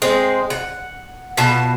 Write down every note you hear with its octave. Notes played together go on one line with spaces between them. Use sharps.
G#3 C4
F#5
B2 F4 A5